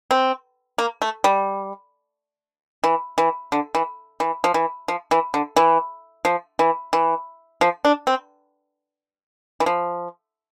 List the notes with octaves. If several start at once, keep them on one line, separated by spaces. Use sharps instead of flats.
C4
A#3
A3
G3
E3
E3
D3
E3
E3
F3
E3
F3
E3
D3
E3
F3
E3
E3
F3
D4
C4
E3
F3